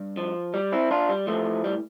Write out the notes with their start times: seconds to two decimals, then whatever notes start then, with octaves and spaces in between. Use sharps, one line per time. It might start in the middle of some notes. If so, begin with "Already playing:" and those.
Already playing: G2
0.17 F3
0.54 G3
0.72 C4 E4
0.91 D4 F4
1.09 G3
1.27 A2 E3 F3 A3
1.64 G3